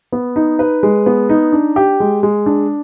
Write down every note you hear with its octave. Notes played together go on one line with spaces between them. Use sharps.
B3
D#4
B4
G#3
B3
D#4
D4
G4
G#3
G#3
D4